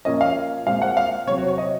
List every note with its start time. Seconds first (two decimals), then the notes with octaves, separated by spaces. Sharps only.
0.05 A#2 F3 A#3 C#4 D#5
0.21 F5
0.67 A#2 G#3 C4 F5
0.82 F#5
0.97 F5
1.27 C3 F#3 C4 C#5
1.38 F#4
1.48 C#5
1.58 D#5